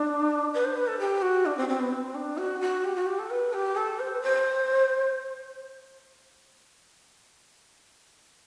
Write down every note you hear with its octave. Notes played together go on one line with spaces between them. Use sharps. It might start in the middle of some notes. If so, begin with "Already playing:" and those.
Already playing: D4
B4
C5
B4
A4
G4
F#4
D4
C4
C4
B3
C4
D4
F#4
F#4
G4
F#4
G4
A4
B4
G4
A4
C5
B4
C5